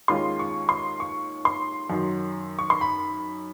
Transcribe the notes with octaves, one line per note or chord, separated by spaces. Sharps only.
D#2 D#3 G#3 C#4 F4 C6
C#6
C6
C#6
C6
F#2 D#3 F#3
C#6
C6
B5